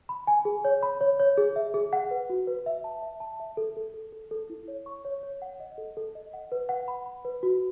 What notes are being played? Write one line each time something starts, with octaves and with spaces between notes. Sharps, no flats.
B5
G#5
G#4
C#5
B5
C#5
C#5
G#4
E5
G#4
F#5
B4
F#4
B4
E5
A5
E5
A5
E5
A4
A4
A4
A4
A4
E4
C#5
C#6
C#5
C#5
F#5
D#5
A4
A4
D#5
F#5
B4
F#5
B5
B5
B4
F#4